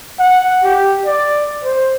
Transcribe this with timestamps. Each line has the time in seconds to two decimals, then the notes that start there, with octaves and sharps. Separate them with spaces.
0.19 F#5
0.64 G4
1.05 D5
1.64 C5